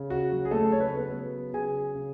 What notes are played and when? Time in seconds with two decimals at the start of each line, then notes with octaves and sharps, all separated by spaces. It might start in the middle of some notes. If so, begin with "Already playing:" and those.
Already playing: C#3
0.10 F#4
0.31 F#3
0.45 G#4
0.51 A3 A4
0.71 C#3 C#5
0.80 B4
0.89 A4
0.97 B3 B4
1.12 F#3
1.53 C#3 G#4 G#5
1.95 C#3